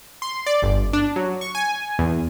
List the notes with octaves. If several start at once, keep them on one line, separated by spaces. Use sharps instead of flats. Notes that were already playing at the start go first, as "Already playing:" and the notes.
C6
D5
G1
D4
F#3
C#6
G#5
E2